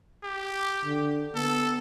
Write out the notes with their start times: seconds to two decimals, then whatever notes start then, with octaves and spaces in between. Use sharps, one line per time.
0.24 G4
0.85 D3
1.35 B3 A4